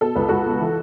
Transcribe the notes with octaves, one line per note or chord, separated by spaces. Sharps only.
B2 A4
C#2 B4
C#2 F#4 A4
B2
E3